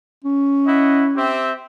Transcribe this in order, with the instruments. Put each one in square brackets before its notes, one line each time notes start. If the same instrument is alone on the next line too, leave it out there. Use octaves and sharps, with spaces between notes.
[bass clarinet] C#4
[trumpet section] E4 D#5 F#5
C4 G4 E5